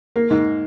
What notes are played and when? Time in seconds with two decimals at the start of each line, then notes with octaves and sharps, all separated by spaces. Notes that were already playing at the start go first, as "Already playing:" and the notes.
0.16 A#3
0.31 G#2